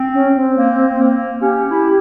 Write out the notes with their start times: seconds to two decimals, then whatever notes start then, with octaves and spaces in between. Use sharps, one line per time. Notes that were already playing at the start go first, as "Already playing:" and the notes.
Already playing: C4
0.13 C#4
0.36 C4
0.57 A#3
0.99 A#3
1.41 C#4 G4
1.71 E4